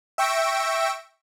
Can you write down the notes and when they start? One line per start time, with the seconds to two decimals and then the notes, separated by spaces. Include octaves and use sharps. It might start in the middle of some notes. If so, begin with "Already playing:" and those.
0.18 E5 G5 C#6 E6 A#6 D7